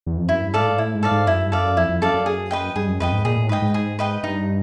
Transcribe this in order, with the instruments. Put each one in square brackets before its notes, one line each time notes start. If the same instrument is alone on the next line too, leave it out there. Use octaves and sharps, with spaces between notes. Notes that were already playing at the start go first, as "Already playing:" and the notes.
[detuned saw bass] E2
F2
[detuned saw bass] F#2 [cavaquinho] E4
[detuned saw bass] G2
[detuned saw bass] G#2 [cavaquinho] A4 D5 F5
[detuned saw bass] A2
G#2
[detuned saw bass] A2 [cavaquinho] E4
[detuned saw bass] G#2
[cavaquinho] A4 D5 F5
[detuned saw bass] G#2
[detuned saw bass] F#2 [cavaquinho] E4
[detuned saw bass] G2
[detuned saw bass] F#2 [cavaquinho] A4 D5 F5
[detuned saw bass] F2 [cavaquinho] E4
[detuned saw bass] F2
[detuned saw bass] F#2 [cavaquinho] A4 D5 F5
[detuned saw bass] F#2
[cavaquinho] G#4
B4 D#5 G5
[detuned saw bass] G2 [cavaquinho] G#4
[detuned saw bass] F#2
[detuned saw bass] F2 [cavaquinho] B4 D#5 G5
[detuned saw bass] G#2
[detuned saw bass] A#2 [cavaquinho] G#4
[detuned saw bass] A2
[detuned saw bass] G#2 [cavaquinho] B4 D#5 G5
[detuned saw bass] G#2
[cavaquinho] G#4
B4 D#5 G5
[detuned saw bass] G2 [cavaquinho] D#4